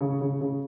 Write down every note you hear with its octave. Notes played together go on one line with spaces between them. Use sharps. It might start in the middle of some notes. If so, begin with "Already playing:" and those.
C#3
C#3
C#3